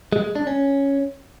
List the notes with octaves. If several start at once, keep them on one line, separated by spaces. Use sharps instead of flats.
G#3
G#3
D4
C#4